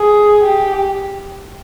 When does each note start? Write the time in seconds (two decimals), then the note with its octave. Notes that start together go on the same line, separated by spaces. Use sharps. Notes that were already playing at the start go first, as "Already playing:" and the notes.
Already playing: G#4
0.43 G4